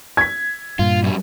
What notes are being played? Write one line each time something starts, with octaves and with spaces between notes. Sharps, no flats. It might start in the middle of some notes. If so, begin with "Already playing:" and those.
G#6 B6
G2 A#2 F4
F#2 G3